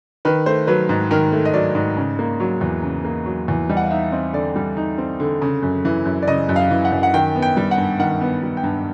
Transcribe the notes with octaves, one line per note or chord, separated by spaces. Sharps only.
D#3 B4
A3 C5
F#3 B4
G#2
D#3 A#4
A3
D#5
F#3 D5
G#2
C#3
A#3
F#3
E2
C#3
A#3
F#3
E2
G3 D#5
F#5
F5
D#4 E5
C4 D#5
D3 D5
G3
D#4
C4
D3
C#3
F#2
E3
F#2
D5
C#3 D#5
F#2
F5
E3
F#5
F#2
F#5
D#3 G5
B3
G5
G3
F#5
G2
D#3 F#5
B3
G3
G5
G2